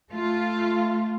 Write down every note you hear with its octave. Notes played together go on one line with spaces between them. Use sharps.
A3 F4